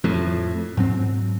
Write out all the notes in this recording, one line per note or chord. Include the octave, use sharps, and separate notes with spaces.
F2 A2
G#2 F#3 C4